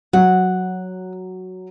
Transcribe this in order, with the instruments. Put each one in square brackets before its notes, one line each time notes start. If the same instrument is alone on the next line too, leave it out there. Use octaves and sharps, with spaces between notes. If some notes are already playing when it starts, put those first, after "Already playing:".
[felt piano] F#3 [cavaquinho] F#5